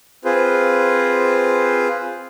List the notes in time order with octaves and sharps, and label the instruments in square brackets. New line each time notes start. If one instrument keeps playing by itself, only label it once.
[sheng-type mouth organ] C4 F4 G#4 B4 C5